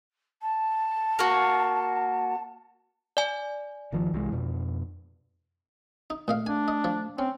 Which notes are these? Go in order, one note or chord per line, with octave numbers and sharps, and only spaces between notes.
A5
A#3 F#4
D5 G#5
G1 D#3 F3
C2 E3 G#3
F2 B2
D#4
A#2 A3 D#5 F5
D4 G#5
D#5
F3
C4 C#4